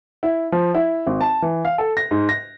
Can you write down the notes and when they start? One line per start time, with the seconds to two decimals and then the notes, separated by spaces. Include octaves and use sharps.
0.23 E4
0.52 F3
0.74 E4
1.07 G#1
1.21 A5
1.42 E3
1.65 F5
1.78 A4
1.97 A#6
2.11 G#2
2.29 A#6